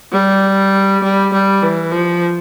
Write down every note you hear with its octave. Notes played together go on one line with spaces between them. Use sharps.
G3
G3
G3
E3
F3